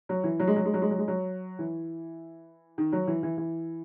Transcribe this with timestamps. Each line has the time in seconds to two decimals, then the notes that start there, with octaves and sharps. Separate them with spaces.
0.09 F#3
0.24 E3
0.40 F#3
0.47 G#3
0.56 F#3
0.65 G#3
0.74 F#3
0.82 G#3
0.91 F#3
0.98 G#3
1.08 F#3
1.59 E3
2.78 D#3
2.92 F#3
3.07 E3
3.23 E3
3.38 E3